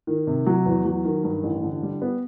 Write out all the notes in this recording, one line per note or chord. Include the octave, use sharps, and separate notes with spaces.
D#3
C3
F#3
E2
F#3
D#3
G2
A1
D3
G3
B3